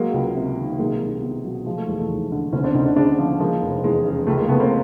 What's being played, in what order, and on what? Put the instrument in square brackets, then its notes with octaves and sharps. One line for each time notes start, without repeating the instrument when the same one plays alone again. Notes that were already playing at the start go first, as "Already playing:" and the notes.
Already playing: [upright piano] F#3 G#3 A#3
C#2
C3
D#3
B1 G#3 A#3
B1
B2
F#3
F3 G#3
A3
E1 G#3
A3
D#2
D3
D2 B3 C#4
C4 D4
D2 C#4 D#4
C4 D4
C#3 C4 D4
F3
F3 G#3 A#3
F1
E2 G#3
C#3
C#2 A3
G#3 A#3
C#2 A3 B3
A#3 C4